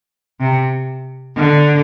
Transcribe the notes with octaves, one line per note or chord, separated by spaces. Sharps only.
C3
D3